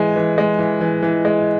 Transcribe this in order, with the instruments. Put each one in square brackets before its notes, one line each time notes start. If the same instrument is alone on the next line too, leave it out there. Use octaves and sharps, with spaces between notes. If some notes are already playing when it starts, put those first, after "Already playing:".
Already playing: [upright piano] E3 G#3 G#5
E3
G#3
E3
E3
E3
G#3